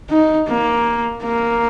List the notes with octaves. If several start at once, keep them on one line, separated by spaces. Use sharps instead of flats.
D#4
A#3
A#3